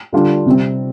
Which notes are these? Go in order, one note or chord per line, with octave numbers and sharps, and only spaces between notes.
D3 G3 D4 F4
C3 G3 C4